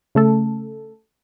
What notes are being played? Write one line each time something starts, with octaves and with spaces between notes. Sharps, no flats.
C#3 A3 A4